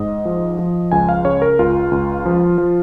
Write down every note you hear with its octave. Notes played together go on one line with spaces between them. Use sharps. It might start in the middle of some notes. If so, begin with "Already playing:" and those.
Already playing: G#2 D#5
F3
F3
C#2 G#5
F5
C#3 C#5
A#4
C#2 F4
C#2
F3
F3